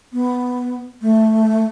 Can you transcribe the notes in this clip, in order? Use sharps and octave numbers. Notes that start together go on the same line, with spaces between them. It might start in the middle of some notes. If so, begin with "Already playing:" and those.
B3
A3